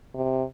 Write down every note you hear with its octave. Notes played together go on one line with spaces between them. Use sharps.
C3